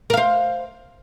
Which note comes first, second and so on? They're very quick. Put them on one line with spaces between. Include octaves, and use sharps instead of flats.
A#4 F5 C5